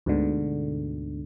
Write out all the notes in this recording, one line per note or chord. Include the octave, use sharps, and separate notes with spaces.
D2 G#2 B2 D3